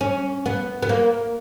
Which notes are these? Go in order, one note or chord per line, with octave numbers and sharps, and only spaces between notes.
C#4
B3
B3
A#3